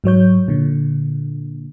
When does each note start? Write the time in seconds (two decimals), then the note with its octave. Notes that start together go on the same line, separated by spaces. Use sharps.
0.04 G#2 F#3 C#5 G6
0.48 A#2 D3